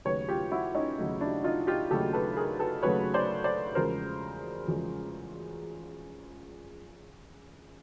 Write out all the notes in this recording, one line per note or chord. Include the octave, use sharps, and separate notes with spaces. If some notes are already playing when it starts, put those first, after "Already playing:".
D#2 C#3 F#3 A3 B4 C#5
F4 G4
E4 F#4
C#4 D#4
D#2 C#3 F#3 A3
D4 E4
D#4 F4
F4 G4
D#2 C#3 F#3 A3 G4 A4
A4 B4
G#4 A#4
A4 B4
D#2 C#3 F#3 A3 B4 C#5
C5 D5
C5 D5
E2 C#3 F3 G#3 A#4 C5
E2 C#3 F3 G#3